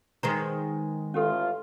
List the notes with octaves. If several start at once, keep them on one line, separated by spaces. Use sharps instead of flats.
D#3 G#3 B4 C5 A#5
A1 C#4 F4 G4 A4